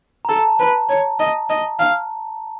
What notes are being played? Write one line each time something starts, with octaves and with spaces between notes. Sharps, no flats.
A#5
A4 A5
B4
C#5
D#5
D#5
F5